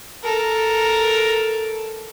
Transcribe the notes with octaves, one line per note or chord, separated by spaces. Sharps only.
A4 A#4